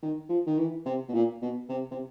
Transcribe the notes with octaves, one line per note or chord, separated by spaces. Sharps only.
D#3
F3
D#3
E3
C3
B2
A#2
B2
C3
C3